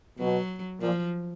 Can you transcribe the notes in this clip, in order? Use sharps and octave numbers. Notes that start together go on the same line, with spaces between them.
B2 F#3
A#2 F3